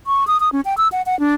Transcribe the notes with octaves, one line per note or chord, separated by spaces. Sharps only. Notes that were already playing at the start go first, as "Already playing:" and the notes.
C#6
D#6
D#6
C#4
G5
E6
F#5
F#5
D4